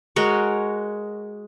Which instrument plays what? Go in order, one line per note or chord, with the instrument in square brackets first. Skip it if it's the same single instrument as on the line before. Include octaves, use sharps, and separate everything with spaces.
[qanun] G#3 F#4 A#4 C#5